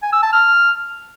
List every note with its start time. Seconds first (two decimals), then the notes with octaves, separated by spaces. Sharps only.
0.02 G#5
0.13 E6
0.23 A5
0.33 F6